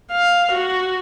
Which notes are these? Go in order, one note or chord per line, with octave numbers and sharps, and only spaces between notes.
F5
F#4